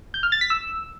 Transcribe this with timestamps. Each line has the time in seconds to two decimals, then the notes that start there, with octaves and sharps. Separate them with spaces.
0.14 G6
0.23 F6
0.32 A6
0.41 B6
0.50 E6